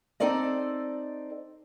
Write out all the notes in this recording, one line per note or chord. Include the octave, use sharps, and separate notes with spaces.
C4 D#4 A4 C5 D5 D#5